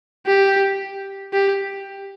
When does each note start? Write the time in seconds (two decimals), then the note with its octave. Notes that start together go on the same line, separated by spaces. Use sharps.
0.27 G4
1.33 G4